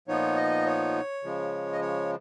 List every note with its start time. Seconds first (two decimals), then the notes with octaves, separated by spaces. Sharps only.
0.08 A#2 F3 B3 D#4 C#5
0.37 D#5
0.66 C#5
1.23 C#3 F3 G#3
1.73 D#5
1.81 C#5